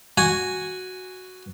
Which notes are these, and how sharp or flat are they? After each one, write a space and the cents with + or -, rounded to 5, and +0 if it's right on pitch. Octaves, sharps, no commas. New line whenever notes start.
F#4 +0 G#5 +0